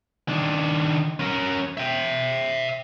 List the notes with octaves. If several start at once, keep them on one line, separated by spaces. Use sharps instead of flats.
D#3 D4
C#4 A#4
E5 G5